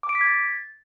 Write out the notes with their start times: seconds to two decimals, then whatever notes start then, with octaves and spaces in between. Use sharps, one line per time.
0.03 D6
0.09 D7
0.15 B6
0.21 G#6
0.27 A6